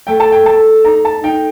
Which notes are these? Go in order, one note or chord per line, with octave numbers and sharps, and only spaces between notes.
A3 G5
A5
G5
A3 A5
D#4 A#5
A5
D#4 G5